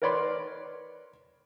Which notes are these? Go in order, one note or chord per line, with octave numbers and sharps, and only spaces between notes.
A#4 B4 C#5 D5 B5 C6